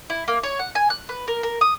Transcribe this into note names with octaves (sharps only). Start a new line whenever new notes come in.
E4
A#3
C#5
F#5
G#5
F#6
B4
A#4
A#4
D#6